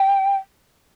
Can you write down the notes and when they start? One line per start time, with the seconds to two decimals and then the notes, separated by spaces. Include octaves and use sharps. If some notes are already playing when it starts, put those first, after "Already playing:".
Already playing: G5